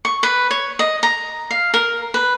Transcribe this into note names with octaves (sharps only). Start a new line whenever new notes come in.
C#6
B4
C#5
D#5
A#5
F5
A#4
B4